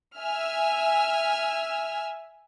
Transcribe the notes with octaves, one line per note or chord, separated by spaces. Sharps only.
E5 G#5 E6 F6